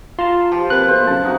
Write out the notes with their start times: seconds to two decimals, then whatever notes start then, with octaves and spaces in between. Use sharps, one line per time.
0.19 F4 A5 A#5 C6
0.52 F3 G4
0.70 C3 A#3 G4 B4 F#6
0.88 B2 A3 A#3 C5
1.07 F#2 C#3 A5
1.24 C3 D#4 F#4